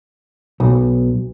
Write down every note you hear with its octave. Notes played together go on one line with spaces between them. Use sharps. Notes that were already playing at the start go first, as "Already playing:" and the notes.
B1